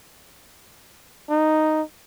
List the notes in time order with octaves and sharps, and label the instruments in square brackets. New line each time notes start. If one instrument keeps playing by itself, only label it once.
[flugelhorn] D#4